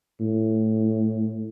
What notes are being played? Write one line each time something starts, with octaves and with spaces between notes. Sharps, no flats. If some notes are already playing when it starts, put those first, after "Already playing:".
A2